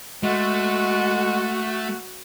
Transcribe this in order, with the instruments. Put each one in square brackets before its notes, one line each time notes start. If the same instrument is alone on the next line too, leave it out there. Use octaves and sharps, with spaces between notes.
[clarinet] G#3 [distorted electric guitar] A3 [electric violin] F#4